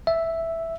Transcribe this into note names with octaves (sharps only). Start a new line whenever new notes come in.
E5